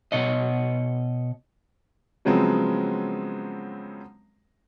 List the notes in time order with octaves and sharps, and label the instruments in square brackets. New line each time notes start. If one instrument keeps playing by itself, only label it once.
[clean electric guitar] B2 C#5 D#5
[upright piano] C#3 F3 F#3 G#3 B3 C4